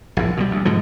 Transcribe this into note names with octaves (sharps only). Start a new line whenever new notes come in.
A#1 A2
B2 D#3 G3
D2
G#2 B2 D3 F3